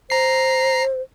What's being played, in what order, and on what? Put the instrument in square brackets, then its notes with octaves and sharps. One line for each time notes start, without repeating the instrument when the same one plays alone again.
[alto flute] C5 [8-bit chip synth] A#5 C7